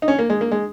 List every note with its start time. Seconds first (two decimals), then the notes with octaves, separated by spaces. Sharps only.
0.02 D#4
0.08 C#4
0.19 A#3
0.30 G#3
0.41 A#3
0.51 G#3